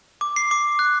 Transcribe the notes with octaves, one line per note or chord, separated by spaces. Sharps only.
D6
C7
D6
F#6